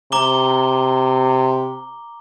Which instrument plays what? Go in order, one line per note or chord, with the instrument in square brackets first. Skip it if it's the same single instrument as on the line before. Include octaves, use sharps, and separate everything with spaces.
[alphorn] C3 [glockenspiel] A#5 D6 G7